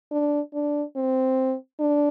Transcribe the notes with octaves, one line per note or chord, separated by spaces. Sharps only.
D4
D4
C4
D4